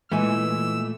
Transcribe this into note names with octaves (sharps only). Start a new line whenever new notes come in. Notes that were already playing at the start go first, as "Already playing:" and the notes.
A#2 E3 G#3 A3 G#5 E6